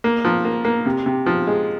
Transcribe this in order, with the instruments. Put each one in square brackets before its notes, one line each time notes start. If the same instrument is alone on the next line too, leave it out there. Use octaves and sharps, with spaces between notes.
[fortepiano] A#3
F3
A#3
A#3
C3
C3
F3
G#3